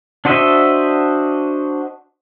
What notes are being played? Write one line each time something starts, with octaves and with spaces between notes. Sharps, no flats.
D4 F#4 C5 D#5 E5